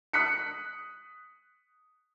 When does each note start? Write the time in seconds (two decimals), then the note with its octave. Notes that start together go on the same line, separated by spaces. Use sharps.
0.13 D#6 F#6 B6 C#7